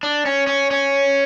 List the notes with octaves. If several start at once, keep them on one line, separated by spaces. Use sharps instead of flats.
D4
C#4
C#4
C#4